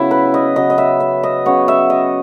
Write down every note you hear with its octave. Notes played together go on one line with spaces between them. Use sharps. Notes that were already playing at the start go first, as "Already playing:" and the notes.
Already playing: C#3 F#3 B3 E4
B4
D#5
C#3 F#3 B3 D#5
D#5
E5
E5
D#5
C#3 F#3 B3 C#5
E5
D#5